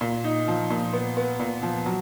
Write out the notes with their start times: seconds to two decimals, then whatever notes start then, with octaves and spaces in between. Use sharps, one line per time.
0.01 A#2
0.24 D#4
0.48 F3
0.70 A#2
0.93 B3
1.17 B3
1.40 A#2
1.63 F3
1.86 F#3